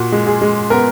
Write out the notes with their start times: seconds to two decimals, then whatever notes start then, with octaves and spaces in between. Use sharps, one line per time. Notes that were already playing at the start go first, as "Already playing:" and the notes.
Already playing: A#2 F#4
0.12 G#3
0.27 G#4
0.41 G#3
0.70 B3 A#4